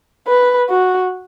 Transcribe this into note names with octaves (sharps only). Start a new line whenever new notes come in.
B4
F#4